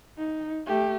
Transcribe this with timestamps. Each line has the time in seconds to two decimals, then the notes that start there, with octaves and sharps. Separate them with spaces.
0.18 D#4
0.67 A3 G4